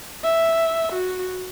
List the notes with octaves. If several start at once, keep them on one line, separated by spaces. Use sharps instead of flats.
E5
F#4